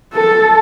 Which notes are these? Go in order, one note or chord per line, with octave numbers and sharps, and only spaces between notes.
A4